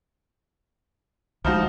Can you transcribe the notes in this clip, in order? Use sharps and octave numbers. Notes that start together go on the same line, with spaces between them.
D2 F3 G#3 D#4 F#4